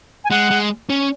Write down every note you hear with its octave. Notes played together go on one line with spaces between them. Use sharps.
G#5
G#3 F#5
G#3
C#4